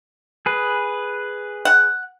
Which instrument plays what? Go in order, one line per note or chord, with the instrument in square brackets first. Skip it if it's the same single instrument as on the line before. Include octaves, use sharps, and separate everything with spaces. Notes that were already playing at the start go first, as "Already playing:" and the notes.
[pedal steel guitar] G#4 B4
[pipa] F#5